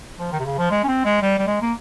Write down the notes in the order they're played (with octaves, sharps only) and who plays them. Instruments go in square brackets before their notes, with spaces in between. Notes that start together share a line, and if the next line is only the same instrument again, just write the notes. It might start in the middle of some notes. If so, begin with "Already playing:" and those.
[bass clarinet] F3
D#3
C3
C#3
F3
G#3
C#4
C4
G#3
G3
G3
G#3
A#3